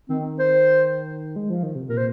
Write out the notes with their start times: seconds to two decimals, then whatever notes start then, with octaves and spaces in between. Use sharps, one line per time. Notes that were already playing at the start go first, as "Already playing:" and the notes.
0.09 D#3 C4
0.39 C5
1.36 G#3
1.50 F3
1.63 D#3
1.76 C3
1.89 A#2 A#4
1.98 C5